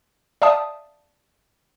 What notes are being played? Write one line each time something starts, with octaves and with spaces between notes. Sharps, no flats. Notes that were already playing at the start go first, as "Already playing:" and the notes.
D5 E5 F5 G5 A5 D#6